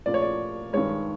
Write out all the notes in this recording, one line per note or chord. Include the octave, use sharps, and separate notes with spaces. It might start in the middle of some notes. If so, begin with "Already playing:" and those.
A#2 F3 A3 D5
C#5
D5
G2 D#3 G#3 C#5